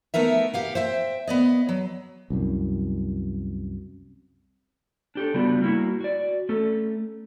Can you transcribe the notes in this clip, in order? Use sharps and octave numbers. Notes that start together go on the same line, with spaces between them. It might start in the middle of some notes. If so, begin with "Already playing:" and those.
A3 B3 D#4 A#4 E5
G4 F5 F#5
C5 E5 G5
B3 D5 D#5
F#3
C2 F#2
D4 G4 A4
C#3 G3 B3 D4 F4 F#4
G3 A#3 E4 F#4
F#4 D5
A3 C#4 A4